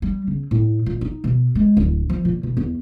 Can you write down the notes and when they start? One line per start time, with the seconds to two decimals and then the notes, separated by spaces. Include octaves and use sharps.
0.02 G3
0.27 C#3
0.51 A2
0.86 A#2
1.01 D#4
1.24 B2
1.55 G#3
1.77 D1
2.09 F3
2.25 A#2
2.43 B2
2.57 E2